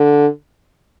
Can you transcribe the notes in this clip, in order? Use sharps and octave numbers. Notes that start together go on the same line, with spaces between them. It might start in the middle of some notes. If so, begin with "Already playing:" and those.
Already playing: D3